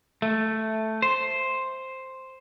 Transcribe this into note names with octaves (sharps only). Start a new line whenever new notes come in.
A3
C5